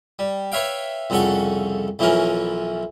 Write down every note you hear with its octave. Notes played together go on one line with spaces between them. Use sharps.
G3
B4 C#5 E5 F5 G5
C2 F2 C#3 A4 F#5 C#6
B1 E3 F3 C#4 A#4